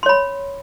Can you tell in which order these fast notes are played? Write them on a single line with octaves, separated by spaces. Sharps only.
C6 C#5 B5